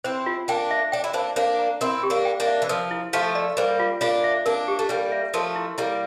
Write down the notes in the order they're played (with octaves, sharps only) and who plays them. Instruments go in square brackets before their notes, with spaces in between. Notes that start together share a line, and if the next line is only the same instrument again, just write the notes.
[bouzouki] C4 E4 [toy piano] C5
[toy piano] F4
[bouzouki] A#3 D4 [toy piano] G5
[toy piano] E5
[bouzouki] D4 [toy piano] G5
[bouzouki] E4
[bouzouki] A#3 D4 [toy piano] C5
[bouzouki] A#3 D4 [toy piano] C5
[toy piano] A#5
[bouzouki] C4 E4 [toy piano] A#4
[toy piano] G4
[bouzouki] A#3 D4
[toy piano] G5
[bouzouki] A#3 D4
[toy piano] E5
[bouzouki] E3
[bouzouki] F3 [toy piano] A#4
[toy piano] E4
[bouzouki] F3 A3 [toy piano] F5
[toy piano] D5
[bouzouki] G3 A#3 [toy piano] C5
[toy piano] F4
[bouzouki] A#3 D4 [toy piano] F4
[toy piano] E5
[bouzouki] A#3 D4 [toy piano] A#4
[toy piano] G4
[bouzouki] A3
[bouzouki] G3 A#3 [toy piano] A5
[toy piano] E5
[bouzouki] F3 A3 [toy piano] A#4
[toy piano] E4
[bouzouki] G3 A#3 [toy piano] E4